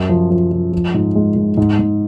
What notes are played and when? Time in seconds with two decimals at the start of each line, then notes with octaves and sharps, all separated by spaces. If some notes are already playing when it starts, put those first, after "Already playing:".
Already playing: F#2
0.09 F3
0.30 F3
0.52 F3
0.73 F3
0.94 G#2
1.15 G#3
1.36 G#2
1.57 G#2
1.79 G#2